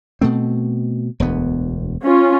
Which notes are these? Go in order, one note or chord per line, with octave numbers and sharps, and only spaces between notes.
B2 A3 C4
E1 D2 B3
C#4 F4